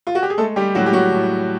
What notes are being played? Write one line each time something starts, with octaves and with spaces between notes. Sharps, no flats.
F4
F#4
G4
G#4
G#3 A3 A4
G3 G4
A2 F#3 F#4
G4
F#3 F#4
A2